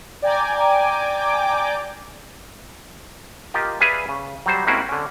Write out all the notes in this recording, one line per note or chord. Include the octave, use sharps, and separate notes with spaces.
D5 G5 G#5 A#5 D6
F4 G4 A#4 D#5
G#4 B4 D5 E5 F5 G#5
C#3
F#3 G3 C5
G#3 A#3 C4 C#4 E4 F#4
D3 C#4